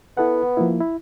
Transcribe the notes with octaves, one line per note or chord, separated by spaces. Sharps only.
B3 E4 A4 F#5
F3 A#3 E4
E4